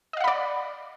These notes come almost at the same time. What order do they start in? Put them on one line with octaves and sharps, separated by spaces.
D#5 F5 F#5 B5 D5